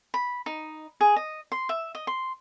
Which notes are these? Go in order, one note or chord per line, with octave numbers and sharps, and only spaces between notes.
B5
D#4
G#4
D#5
C6
E5
D#5
C6